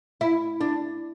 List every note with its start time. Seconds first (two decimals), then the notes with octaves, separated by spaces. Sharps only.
0.21 E4
0.61 D4